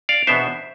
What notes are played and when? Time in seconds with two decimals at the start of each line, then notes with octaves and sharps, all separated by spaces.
0.09 D5 F5
0.27 E2 B2 B3 D4 C5 E5